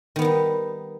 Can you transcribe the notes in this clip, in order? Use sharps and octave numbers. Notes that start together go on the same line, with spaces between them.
D#3 G3 B3 D#4